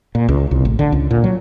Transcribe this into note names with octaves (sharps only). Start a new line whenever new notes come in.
A#2
C#2
C2
A1
D3
C#2
A#2
F#3